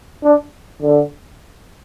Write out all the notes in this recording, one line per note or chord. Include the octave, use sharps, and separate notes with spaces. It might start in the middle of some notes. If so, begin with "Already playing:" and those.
D4
D3